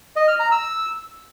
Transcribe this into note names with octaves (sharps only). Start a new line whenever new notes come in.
D#5
F6
A#5
E6